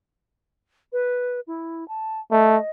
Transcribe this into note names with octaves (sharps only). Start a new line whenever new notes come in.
B4
E4
A5
A3 D#5